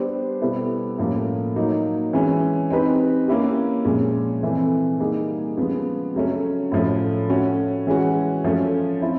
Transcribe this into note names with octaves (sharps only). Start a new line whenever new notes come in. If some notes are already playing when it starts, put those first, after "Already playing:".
Already playing: G3 B3 D4 G4 C5
B2 G3 B3 E4 A4
A2 F3 A#3 C#4
F#3 A#3 D#4
E3 G#3 C#4
C4 D#4 G4 B4
A#3 C#4 E4 G4
A#2 F3 G#3 C#4
C3 E3 A3 C4
G3 A#3 D#4 G#4
C#3 F3 G#3 B3
C#3 F#3 A3 C#4
A2 F3 A3 C#4
A3 C#4 F#4
E3 G#3 C#4 F#4
F3 A3 C#4
C4 E4